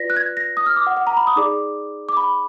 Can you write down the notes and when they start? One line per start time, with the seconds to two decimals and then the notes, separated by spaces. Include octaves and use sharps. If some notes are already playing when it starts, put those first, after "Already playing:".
Already playing: F4 B4 D5 A#6 B6
0.10 F#6
0.16 G#6
0.37 A#6
0.57 D#6
0.66 F6
0.76 D6
0.87 F#5
0.97 F#5
1.07 A#5
1.17 B5
1.27 D#6
1.36 D#4 G#4 D5 D6
2.09 D6
2.17 B5